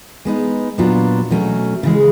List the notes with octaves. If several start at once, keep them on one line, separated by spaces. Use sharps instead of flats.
G#3 B3 D#4
A#2 F#3 B3 D4 F4
B2 F#3 A3 C#4
C#3 E3 G#3